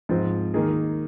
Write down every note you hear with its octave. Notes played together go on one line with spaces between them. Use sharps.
G#2 F3 C4
D#3 A#3 D#4 G#4